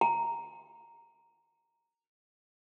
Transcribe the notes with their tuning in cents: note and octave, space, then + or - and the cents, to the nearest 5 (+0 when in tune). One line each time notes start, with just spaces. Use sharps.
A#5 -5